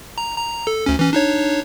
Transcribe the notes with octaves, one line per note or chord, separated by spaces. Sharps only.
A#5
A#5
A4
D2 C#4
E3 C#4
D4 D#4 C#5